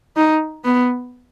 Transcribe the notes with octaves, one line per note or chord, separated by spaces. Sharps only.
D#4
B3